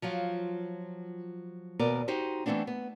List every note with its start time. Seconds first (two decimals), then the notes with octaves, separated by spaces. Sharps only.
0.02 F3 F#3 F4
1.79 D#2 B2 B3 A#4 D5
2.08 D#4 F#4 G4 C5
2.46 E3 A3 B3 C4 D4
2.67 B3